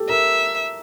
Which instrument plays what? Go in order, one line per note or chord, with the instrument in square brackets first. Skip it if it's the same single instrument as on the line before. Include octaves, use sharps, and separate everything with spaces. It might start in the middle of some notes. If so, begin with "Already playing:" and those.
Already playing: [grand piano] G4 A4
[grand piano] A#4 [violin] E5